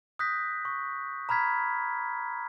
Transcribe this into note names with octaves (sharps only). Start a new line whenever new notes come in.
D#6 F#6 G6 A#6 B6
C#6
A#5 B5 F6 G#6 B6